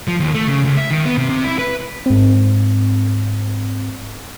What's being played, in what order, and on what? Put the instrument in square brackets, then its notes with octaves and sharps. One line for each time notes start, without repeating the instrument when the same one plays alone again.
[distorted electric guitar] F3
D#2
A3
C#3
C#2
E5
D#3
B3
C3
C3
E4
B4
[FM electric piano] G#2 C4